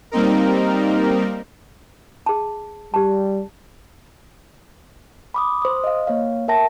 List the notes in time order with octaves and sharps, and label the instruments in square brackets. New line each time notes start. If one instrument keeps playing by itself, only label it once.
[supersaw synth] G3 A#3 C4 D#4 A#4
[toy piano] G#4 A5
[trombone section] G3 [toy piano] G4 A5
[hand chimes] B5 D6 D#6
C5 D#6
D#5 F5
A#3 C#5 F5
A#4 E5 G5 A5 A#6